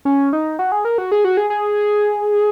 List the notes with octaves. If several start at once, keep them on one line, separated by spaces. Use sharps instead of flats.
C#4
D#4
F#4
G#4
A#4
F#4
G#4
F#4
G#4
G#4